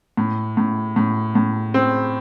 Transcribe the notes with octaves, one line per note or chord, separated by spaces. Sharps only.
A2
A2
A2
A2
C4